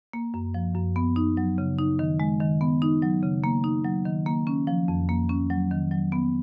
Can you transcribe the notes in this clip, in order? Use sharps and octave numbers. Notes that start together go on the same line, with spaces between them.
A#3
F#2
F3
F#2
B3
D#4
F#3
C#3
D#4
D#3
G#3
D#3
B3
D#4
F#3
C#3
A#3
D#4
F#3
D#3
A#3
C#4
F3
F2
A#3
C#4
F#3
D#3
F#3
B3